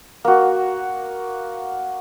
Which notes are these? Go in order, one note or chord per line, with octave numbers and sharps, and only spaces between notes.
A#3 F#4